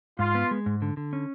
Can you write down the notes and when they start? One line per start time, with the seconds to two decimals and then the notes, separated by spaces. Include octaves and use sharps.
0.19 G#2 F4
0.35 B3
0.51 G#3
0.66 G#2
0.82 D3
0.97 D3
1.13 C#4